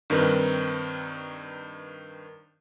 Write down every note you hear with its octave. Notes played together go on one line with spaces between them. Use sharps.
G2 D#3 C4 A#4 B4